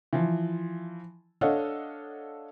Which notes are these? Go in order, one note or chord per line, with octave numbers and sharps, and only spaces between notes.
E3 F3
D4 A4 C#5 D#5 F5 F#5